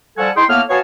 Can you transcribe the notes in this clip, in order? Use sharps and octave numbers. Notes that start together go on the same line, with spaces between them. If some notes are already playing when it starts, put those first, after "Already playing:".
F3 G3 A4 F#5 G#5 A5
D#4 E4 G#4 G5 C6
A2 A#3 B3 F6
B3 F#4 C#5 F5 G#5 A5